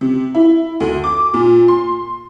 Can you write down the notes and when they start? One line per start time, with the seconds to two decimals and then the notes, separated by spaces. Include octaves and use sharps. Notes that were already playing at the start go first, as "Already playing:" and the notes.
0.01 C3
0.35 E4
0.80 D2
1.04 D6
1.34 A#2
1.68 C6